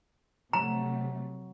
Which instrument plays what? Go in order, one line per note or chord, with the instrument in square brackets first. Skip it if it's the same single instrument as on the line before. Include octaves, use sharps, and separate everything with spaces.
[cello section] C3 A3 [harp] F#3 [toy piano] A#5